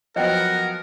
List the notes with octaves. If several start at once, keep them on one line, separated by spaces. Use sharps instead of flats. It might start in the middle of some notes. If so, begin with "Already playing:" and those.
F3 F#3 B3 A#4 D#5 F#5 G5